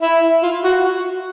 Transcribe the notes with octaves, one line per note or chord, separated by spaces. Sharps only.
E4
F4
F#4